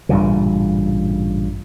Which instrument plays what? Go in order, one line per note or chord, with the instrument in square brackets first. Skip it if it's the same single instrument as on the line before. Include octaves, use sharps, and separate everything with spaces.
[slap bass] A1 G2 A#2 C#3